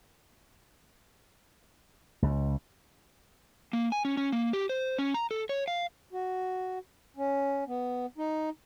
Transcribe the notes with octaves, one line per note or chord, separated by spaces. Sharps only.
C#2
A#3
G#5
C#4
C#4
A#3
G4
C5
C#4
A#5
A4
C#5
F5
F#4
C#4
B3
D#4